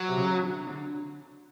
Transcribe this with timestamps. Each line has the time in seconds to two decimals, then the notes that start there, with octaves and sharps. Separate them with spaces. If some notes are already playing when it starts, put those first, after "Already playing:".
Already playing: F#3
0.08 C3
0.17 C#3
0.42 D3
0.67 D3